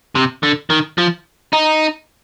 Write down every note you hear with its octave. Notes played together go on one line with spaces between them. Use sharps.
C3
D3
D#3
F3
D#4